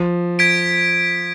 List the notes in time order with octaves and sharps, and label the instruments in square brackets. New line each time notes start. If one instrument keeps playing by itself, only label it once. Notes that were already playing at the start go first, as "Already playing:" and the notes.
Already playing: [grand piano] F3
[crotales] G#6 B6 D7